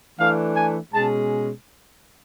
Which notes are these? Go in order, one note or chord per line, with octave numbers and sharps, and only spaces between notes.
E3 A3 D4 F5
G#5
B2 G#3 C#4 A5